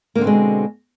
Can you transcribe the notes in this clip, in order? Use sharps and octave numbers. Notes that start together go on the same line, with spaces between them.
B2 D3 G#3 A#3 C4